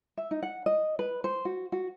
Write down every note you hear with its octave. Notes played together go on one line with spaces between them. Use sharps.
E5
D#4
F#5
D#5
B4
C5
F#4
F#4